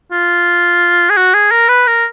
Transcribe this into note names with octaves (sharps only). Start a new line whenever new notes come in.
F4
G#4
F#4
G#4
A#4
B4
A#4